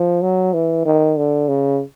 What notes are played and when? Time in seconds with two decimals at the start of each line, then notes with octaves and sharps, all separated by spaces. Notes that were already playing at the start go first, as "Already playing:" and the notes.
Already playing: F3
0.22 F#3
0.54 E3
0.85 D#3
1.17 D3
1.48 C#3